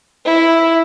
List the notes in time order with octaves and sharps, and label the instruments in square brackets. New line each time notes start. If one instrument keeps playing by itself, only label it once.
[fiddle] E4